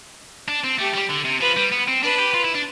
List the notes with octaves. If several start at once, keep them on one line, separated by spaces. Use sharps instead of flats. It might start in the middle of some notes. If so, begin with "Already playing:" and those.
D4
C4
A3 G4
G3
D3
C3
F3 B4
G3
B3
C4
D4 B4
G4
F4
E4
D4